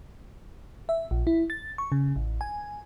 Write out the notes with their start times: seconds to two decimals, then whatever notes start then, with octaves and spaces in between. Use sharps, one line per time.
0.89 E5
1.11 A#1
1.27 E4
1.50 A6
1.78 C#6
1.92 C#3
2.16 A1
2.41 G#5